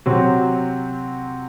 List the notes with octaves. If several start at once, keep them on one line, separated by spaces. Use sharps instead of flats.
C3 F#3 C4 F#4